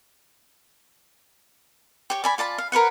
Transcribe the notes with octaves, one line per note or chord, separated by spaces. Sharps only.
G4 C#5
D5 G#5 B5
F4 D5 A5 B5
F5
A#4 B4 C#5 F#5